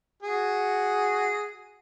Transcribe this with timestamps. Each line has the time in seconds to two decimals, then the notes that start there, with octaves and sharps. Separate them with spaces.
0.23 F#4 G#4